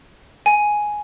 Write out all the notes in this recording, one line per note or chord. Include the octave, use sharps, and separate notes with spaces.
G#5